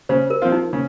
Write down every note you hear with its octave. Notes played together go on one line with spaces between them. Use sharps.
C#3 C5
A#4
F3 C4 F4
D#4
C#3